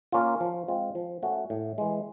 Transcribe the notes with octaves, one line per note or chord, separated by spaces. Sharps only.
A#3 C#4 F4
F3
G#3 C4 F4
F3
A3 C#4 F#4
A2
E3 G#3